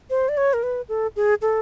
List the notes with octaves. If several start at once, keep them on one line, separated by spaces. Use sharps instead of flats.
C5
D5
C#5
A#4
B4
A4
G#4
A4